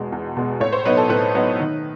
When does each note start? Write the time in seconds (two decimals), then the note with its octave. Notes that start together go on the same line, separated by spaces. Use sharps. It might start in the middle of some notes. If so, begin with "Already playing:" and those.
Already playing: E2 B2 G#3
0.12 E2
0.37 B2 G#3
0.60 A2 C#5
0.73 C5
0.85 F#3 B3 D#4 B4
0.97 A4
1.09 A2 B4
1.34 F#3 B3 D#4
1.60 D#3